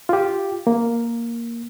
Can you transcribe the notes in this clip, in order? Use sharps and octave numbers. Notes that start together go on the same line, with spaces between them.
F4 G4
A#3